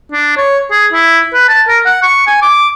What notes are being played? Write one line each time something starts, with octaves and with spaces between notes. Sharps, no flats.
D4
C#5
G#4
E4
B4
A5
A#4
F#5
C#6
G#5
D6